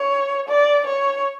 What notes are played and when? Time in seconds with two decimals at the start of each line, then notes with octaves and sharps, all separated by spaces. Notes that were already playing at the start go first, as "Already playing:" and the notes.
Already playing: C#5
0.48 D5
0.86 C#5